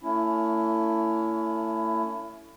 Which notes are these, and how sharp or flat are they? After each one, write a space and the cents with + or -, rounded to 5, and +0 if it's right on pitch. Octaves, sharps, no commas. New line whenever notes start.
A3 +35 C#4 +30 E4 +10